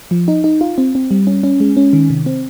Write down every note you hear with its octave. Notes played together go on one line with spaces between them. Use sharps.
F3
D#4
D#4
F4
C4
C4
G3
C#4
C#4
G#3
C#4
D#3
C3
C4